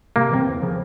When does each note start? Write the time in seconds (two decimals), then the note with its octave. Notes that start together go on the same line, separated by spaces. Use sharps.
0.16 C3 A#3
0.31 E3 G#3 C4
0.46 E2
0.62 C#3 F3